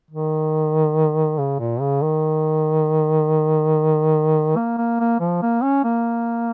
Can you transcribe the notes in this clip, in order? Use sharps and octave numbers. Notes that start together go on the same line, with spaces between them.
D#3
C#3
A#2
C#3
D#3
A#3
A#3
A#3
F3
A#3
C#4
A#3